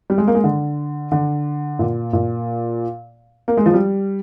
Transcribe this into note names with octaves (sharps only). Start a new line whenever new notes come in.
G3
G#3
A#3
G#3
D3
D3
A#2
A#2
A#3
G#3
F3
G3